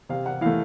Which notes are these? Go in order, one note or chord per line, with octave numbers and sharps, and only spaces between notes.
C3 F5
F#5
E3 A3 F5